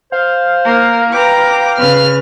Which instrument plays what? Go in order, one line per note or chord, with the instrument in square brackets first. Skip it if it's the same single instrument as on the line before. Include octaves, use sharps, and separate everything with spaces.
[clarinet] C5 [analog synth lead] F5
[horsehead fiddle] A#3 A#4
[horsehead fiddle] B4 A#5 [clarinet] G5 [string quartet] D6
[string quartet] C#3 F6 [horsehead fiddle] B4